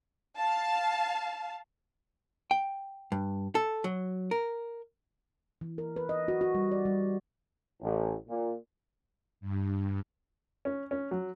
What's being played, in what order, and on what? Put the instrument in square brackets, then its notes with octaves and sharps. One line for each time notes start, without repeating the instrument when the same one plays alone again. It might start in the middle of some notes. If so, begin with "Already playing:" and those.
[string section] F5 A5
[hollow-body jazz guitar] G5
G2
A4
F#3
A#4
[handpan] E3
A#4
B4
D#5
F#4
F#4
G3
D5
G3
[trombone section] A1
A#2
[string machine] G2
[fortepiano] C#4
C#4
F#3